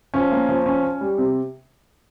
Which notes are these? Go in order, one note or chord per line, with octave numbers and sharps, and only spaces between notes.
F3 C#4
A#3
F3
C#4
C#4
G3
C3